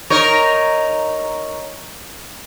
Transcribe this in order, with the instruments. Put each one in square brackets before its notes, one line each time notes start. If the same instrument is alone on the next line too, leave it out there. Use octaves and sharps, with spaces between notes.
[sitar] D#4 A#4 C#5